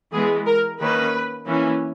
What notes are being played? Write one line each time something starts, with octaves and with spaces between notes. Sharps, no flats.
E3 G#3 B3 G#4
A#4
D#3 A#3 C#4 B4
E3 A#3 C#4